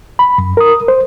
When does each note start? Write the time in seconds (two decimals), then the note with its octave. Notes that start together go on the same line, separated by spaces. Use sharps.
0.19 B5
0.38 F#2
0.57 A#4 D#6
0.88 C5